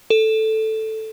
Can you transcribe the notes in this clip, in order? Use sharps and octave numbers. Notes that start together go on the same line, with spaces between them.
A4